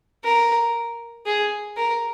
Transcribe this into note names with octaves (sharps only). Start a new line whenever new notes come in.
A#4
G#4
A#4